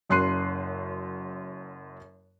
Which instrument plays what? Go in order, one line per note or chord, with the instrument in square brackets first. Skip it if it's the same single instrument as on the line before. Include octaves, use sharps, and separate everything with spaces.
[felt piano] F#1 F#2 C6 F#6 C7 D#7